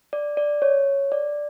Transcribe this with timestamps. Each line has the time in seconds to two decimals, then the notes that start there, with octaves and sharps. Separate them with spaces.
0.13 D5
0.37 D5
0.62 C#5
1.12 D5